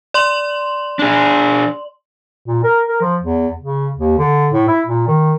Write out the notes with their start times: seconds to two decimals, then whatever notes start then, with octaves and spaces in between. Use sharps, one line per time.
0.14 D5 C6 F#7
0.99 D4 G#4
2.47 A#2
2.64 A#4
2.88 A#4
3.01 F3
3.22 E2
3.61 C#3
3.97 D#2
4.19 D3
4.52 A2
4.68 E4
4.86 A#2
5.08 D#3